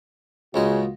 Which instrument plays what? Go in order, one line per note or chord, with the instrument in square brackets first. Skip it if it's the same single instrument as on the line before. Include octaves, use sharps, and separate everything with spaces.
[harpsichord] C#2 G#3 D#5 [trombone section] A#2 F4 F#4 [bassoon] C#3